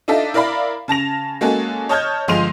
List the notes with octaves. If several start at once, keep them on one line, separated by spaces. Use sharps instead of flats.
D4 D#4 F4 A4 E5
E4 A#4 D5 F5 B5
C#3 A5 A#6 F7
G#3 A#3 C#4 F#4 G#4 A4
C#5 D#5 A5 F6 G6 G#6
G1 F3 G#3 C6 D#7 F7